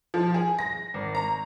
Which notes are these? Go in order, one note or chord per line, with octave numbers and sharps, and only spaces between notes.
F3
G#4
A#6
G#1
A#5